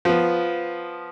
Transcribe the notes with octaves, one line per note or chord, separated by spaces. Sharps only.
F3 B3